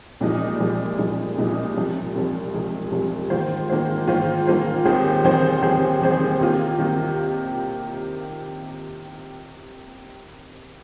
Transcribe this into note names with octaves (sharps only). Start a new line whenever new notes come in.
C2 A#2 F3 G#3 D#4
C2 A#2 F3 G#3 D#4
C2 A#2 F3 G#3 D#4
C2 A#2 F3 G#3 D#4
C2 C3 F3 G#3
C2 C3 F3 G#3
C2 C3 F3 G#3
C2 C3 F3 G#3
G#2 D#3 A#3 F4 C5
G#2 D#3 A#3 F4 C5
G#2 D#3 A#3 F4 C5
G#2 D#3 A#3 F4 C5
D#2 D#3 C4 G#4 C5
D#2 D#3 C4 G#4 C5
D#2 D#3 C4 G#4 C5
D#2 D#3 C4 G#4 C5
C3 D#3 A#3 F4
C3 D#3 A#3 F4